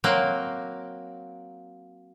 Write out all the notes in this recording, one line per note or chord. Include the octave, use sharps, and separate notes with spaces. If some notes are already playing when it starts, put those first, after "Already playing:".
F#3 A#3 C4